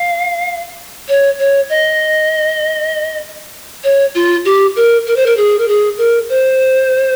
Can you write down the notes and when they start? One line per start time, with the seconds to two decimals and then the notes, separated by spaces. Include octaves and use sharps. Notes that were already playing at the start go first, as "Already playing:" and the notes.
Already playing: F5
1.08 C#5
1.39 C#5
1.69 D#5
3.84 C#5
4.14 F4
4.45 G4
4.76 A#4
5.06 A#4
5.16 C5
5.26 A#4
5.37 G#4
5.58 A#4
5.68 G#4
5.98 A#4
6.29 C5